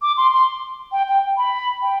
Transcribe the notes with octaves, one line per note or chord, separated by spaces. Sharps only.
D6
C6
C6
G5
G5
B5
G5